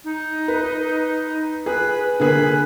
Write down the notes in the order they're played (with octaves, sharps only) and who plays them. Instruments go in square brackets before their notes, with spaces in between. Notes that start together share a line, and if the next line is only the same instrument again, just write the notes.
[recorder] D#4
[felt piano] B4
[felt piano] G#4 [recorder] B4
[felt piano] D3 A#3 G#4 [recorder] B4